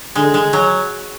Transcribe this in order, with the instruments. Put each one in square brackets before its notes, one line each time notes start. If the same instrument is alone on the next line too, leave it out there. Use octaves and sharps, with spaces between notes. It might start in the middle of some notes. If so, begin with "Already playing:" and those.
[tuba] D3 [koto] G#3
[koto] G#3
F#3